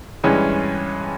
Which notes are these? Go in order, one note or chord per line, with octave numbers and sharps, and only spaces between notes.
G2 E3 G#3 C#4